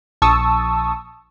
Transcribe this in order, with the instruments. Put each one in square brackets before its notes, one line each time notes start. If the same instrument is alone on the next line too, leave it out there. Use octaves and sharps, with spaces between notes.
[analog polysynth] A#1 A5 C#6 D#6 E6